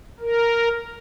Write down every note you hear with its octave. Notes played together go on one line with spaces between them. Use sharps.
A#4